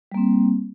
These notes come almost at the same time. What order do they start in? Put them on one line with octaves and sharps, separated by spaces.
G3 A#3 C4